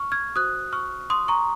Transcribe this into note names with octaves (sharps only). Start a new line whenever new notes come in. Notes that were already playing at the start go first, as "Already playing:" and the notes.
Already playing: C#6 F6
F6 G#6
F#4 C5 D#6 F#6
C#6 F6
C6 D#6
A#5 C#6